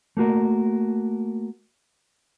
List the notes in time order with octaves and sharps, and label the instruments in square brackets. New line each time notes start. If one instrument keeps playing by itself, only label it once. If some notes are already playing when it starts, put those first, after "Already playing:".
[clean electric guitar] A3 A#3 F#4 A#4